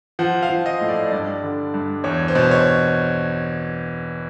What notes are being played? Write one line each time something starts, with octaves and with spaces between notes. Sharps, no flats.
F3 F#5
F5
F3
D#5
A2
D5
G2 D5
D3
G2
E2 C#5
C5
B2
C#5